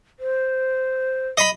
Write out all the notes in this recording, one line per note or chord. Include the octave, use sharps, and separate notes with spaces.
C5
D#5 B5